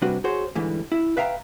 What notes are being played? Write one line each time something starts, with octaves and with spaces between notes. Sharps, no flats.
C3 G3 D4 F#4 B4
F#4 G#4 C5 C#5
G#2 D3 E3 G3
E4
B4 E5 F5 G5 A#5